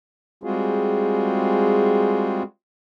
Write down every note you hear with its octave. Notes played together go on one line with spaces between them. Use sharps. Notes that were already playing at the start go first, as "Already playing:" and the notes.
G3 G#3 C4 F4 F#4 G#4